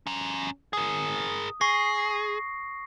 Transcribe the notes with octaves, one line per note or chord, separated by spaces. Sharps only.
C#4 A#5
G#4 A#4 D#6
G#4 C#6 A#6 C7